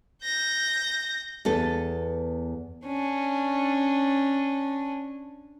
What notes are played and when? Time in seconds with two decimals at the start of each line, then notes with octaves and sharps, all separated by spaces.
0.22 G6 A#6
1.45 E2 B3 A4
2.86 C#4 D4